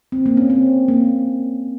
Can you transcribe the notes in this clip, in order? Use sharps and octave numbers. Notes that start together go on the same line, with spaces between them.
C4
A#3
C#4
C4
A#3